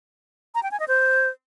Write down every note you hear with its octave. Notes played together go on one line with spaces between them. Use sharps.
A#5
G5
G#5
D#5
C5